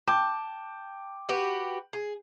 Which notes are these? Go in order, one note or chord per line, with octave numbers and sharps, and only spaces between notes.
G5 A5 D6 G6
F#4 G4 B4
G#4